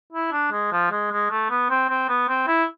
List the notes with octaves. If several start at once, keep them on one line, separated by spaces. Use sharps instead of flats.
E4
D4
G#3
F3
G#3
G#3
A3
B3
C4
C4
B3
C4
E4